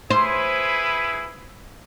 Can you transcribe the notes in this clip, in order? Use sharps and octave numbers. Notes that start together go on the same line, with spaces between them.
E4 G#4 B4 C5